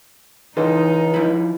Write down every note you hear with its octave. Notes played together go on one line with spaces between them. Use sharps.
C#2 E3 D#4 A4 C5
F3 E4